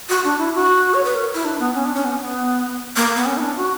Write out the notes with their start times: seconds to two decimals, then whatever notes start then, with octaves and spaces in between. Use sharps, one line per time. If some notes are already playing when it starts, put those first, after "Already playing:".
0.09 F#4
0.24 D4
0.38 E4
0.55 F#4
0.94 C#5
1.05 B4
1.15 A#4
1.34 E4
1.45 D4
1.60 B3
1.75 C#4
1.85 D4
1.95 C#4
2.05 B3
2.20 B3
2.96 A#3
3.16 B3
3.26 C#4
3.37 E4
3.41 D4
3.56 F#4